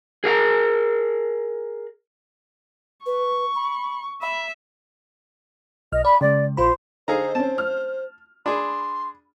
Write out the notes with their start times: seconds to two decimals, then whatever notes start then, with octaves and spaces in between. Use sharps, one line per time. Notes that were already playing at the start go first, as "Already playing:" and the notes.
0.24 G#4 A#4 F5 A#5
3.06 B4 C#6
3.55 B5
4.22 E5 B5
5.92 B1 D#5 F6
6.05 D5 B5
6.21 C#3 G#3 D5
6.57 A#1 F4 C5 B5
7.08 D3 D#4 G#4 A4 C5 F5 A#5
7.35 C4 C#4 A5
7.58 F6
8.46 D4 G#4 B5 C6